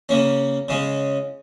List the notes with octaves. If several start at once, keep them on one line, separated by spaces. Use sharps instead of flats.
C#3 A#3 C#4
C#3 G#3 C#4